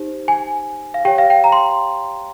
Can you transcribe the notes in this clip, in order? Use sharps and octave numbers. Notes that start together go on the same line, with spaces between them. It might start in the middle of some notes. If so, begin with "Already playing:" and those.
Already playing: D#4 G4 C5
G#5
F5
G4 C#5 G5
F5
G5
A#5
C6